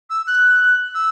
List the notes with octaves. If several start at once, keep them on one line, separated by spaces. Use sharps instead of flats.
E6
F#6
E6